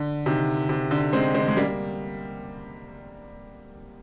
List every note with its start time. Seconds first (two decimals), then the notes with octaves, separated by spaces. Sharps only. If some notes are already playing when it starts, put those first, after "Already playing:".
Already playing: D3
0.26 C3 D#3
0.69 C3
0.91 D3
1.13 G#3 C4
1.34 G#3 C4
1.48 G#3
1.57 G3 A#3